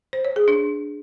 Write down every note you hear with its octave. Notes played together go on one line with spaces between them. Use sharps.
C5
C#5
G#4
D4